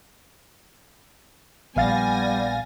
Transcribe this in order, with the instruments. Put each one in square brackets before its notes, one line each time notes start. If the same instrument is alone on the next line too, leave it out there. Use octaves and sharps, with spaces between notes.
[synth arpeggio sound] A#1 F5 A6 [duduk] G3 [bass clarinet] B3 [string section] G#5 A#6